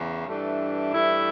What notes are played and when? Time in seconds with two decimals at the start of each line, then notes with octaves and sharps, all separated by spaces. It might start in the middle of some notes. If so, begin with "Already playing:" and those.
Already playing: E2 C#3
0.27 G2 E3 A3 D4
0.92 G2 E3 A3 D4 E4